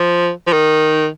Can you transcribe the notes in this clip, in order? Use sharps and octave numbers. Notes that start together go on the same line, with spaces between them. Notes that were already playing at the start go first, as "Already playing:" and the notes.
Already playing: F3
F3
D#3